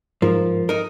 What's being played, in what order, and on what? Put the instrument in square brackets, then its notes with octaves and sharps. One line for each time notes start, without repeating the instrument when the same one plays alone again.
[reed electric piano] G#2 A#4 [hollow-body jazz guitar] F3
[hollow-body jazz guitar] D#4 A#4